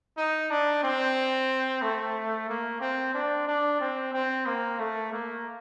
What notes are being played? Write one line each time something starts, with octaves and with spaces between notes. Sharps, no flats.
D#4
D4
C4
A3
A#3
C4
D4
D4
C4
C4
A#3
A3
A#3